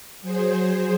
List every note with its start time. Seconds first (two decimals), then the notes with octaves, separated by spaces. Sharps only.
0.22 F#3 G#4 C5